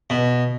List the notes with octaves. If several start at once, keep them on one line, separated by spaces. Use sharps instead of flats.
B2